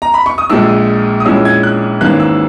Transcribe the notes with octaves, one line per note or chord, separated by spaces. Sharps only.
A#5
B5
C#6
D#6
A#1 A#2 G#3 E6
D#6
A#1 A#2 G#3 C#4 E4 E6
G#6
F#6
G#1 G#2 E3 A#3 C#4 F#6
E6